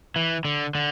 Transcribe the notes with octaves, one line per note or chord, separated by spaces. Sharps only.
E3
D3
D3